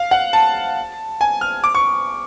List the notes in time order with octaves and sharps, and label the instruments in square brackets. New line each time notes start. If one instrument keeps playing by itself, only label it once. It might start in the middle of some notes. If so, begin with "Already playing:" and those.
Already playing: [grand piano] F5
F#5
A5
G#5
F6
D6
C#6